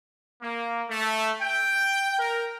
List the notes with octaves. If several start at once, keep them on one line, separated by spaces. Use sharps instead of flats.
A#3
A3
G5
A#4